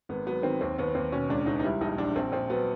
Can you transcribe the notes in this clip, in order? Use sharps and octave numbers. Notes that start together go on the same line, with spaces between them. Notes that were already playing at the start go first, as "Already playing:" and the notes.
G#1 B3
F#3 B3
D#3 C4
D#2 C4
D#2 B3
D#2 C4
B2 C#4
C#2 D4
C#2 D#4
D#4
G3 E4
A#1 D#4
A#1 D4
A#1 C4
A#1 C4
F#3 B3